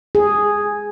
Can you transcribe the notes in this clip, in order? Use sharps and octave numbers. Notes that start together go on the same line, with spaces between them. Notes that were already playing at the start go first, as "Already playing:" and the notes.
G#4